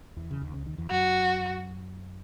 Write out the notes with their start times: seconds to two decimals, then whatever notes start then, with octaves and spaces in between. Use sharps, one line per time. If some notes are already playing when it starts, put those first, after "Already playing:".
0.16 E2 E3
0.31 C#3
0.41 D#2 D#3
0.54 C#2 C#3
0.66 D#2 D#3
0.78 E2 E3
0.90 F#2 F#3 F#4